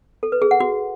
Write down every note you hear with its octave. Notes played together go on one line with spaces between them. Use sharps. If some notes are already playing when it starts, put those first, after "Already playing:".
A4
B4
G#4
F#5
F#4